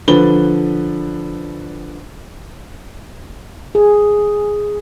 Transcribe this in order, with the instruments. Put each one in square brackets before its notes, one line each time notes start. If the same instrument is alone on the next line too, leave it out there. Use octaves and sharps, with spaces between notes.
[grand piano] D3 F3 D4 B4 G7
[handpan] G#4